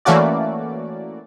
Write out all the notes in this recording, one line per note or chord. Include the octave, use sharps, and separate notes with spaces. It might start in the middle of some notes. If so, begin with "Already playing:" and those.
E3 A3 A#3 C#4 F#4 D5